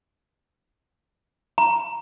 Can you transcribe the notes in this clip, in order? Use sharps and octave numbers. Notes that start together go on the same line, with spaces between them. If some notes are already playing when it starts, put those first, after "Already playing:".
A#5